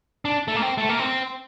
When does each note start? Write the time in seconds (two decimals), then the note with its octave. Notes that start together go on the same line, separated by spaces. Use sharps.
0.25 D4
0.48 A3
0.56 A#3
0.62 C4
0.78 A3
0.89 A#3
0.99 C4